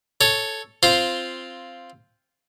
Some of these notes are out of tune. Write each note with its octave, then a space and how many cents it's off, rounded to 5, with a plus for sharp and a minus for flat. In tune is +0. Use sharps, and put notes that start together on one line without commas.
A4 +0 C#5 +0
C4 +0 F4 -5 C5 +0